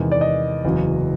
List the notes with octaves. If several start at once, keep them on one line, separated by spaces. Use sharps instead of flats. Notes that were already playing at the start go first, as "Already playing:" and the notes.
Already playing: E2 C3 D#3 G#3 B3
D5
D#5
F#1 E2 C#3 F#3